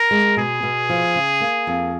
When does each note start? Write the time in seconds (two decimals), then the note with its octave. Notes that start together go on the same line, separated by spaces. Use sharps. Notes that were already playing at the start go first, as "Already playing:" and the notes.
Already playing: A#4
0.11 G#3
0.37 B2 G#4
0.63 B2
0.89 F3
1.15 C#3
1.41 A#3
1.67 F2